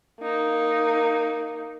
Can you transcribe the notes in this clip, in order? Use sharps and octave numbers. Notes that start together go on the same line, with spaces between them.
A#3 D#4